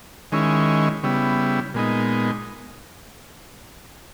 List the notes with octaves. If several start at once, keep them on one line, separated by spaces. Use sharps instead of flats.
D#3 G#3 C#4 E4
C#3 G3 B3 E4
A#2 G#3 B3 D#4